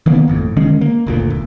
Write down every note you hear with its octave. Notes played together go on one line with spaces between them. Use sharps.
D#3 E3 A#3 B3
G#1 F2 A2
D3 D#3 G#3 C#4
A#3
F#1 D2 A#2
E1